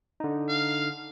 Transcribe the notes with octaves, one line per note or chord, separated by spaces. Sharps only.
D3 D#4
F5